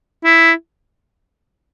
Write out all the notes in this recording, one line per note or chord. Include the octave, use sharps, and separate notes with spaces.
E4